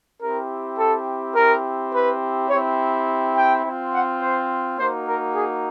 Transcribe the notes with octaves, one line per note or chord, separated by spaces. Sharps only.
C4 E4 G4 A#4
A4
C4 E4 G4 A#4
B4
C4 E4 G4 C#5
G5
C4 F4
F#5
C5
A#3 D#4 F#4 C5
A#4
G#4